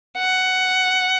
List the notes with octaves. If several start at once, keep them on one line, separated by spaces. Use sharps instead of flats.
F#5